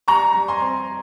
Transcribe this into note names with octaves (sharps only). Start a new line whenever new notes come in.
G3 A#5 C#6
G3
G#5 C6
C4